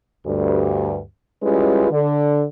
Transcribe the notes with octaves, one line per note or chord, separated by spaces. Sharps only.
D2 G2
G3 G#3 C#4 E4 F4 B4
D3